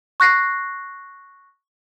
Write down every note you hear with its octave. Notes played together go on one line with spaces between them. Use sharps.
C#6 F#6 A#6 C7